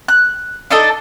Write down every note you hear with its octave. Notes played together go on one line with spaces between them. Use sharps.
F#6
D4 D#4 A4 D#5